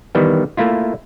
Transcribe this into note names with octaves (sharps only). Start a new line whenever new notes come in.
D#3 E3 G3 B3
A3 A#3 E4 F4